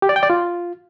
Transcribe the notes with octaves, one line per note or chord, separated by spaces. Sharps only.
G4
D5
G5
D5
F4